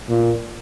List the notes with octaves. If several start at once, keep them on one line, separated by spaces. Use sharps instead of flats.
A#2